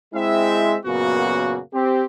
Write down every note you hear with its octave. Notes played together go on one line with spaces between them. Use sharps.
G#3 C4 E4 E5
F#2 A#2 C#3 A#3 B3 F#4
C4 G4